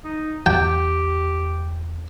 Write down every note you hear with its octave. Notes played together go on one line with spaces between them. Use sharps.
D#4
E2 G4 G5